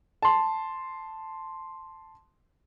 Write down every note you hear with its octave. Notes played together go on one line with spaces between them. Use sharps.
A5 C6